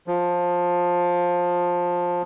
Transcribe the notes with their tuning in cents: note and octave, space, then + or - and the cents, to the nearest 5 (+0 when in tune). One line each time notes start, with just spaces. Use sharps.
F3 +15